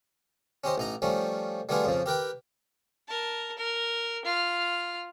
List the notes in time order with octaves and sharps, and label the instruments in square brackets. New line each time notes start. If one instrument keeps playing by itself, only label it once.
[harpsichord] C#4 G4 C5 D#5
A1 D#4 A#5
F3 G3 A3 C#4
G3 A3 B3 D4 F4 G#4
F2 C#3 F3
G4 A#4 B4 G5
[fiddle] A#4 A5
A#4
F4 F6